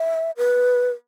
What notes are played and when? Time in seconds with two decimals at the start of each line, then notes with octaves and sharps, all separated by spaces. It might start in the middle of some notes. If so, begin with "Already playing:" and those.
Already playing: E5
0.37 B4